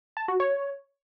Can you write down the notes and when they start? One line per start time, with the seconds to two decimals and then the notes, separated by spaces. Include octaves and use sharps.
0.17 A5
0.28 F#4
0.40 C#5